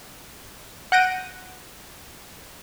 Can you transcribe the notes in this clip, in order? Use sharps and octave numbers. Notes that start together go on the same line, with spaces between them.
F#5 F#6 G6 A#6 D7 D#7